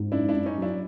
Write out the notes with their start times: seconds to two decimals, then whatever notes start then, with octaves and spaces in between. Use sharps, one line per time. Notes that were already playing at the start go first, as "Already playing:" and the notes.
Already playing: G#2
0.11 F#2 D4 E4
0.28 D4 E4
0.34 F#2
0.46 C#4 D#4
0.57 F#3 D4 E4